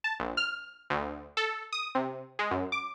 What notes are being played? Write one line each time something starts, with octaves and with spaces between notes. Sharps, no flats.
A5
A#1
F6
D2
A4
D#6
C3
G#3
F#2
D6